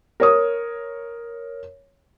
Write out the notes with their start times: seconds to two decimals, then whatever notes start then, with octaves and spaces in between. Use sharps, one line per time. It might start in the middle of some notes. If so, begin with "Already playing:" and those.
0.20 A#4 C#5 D#6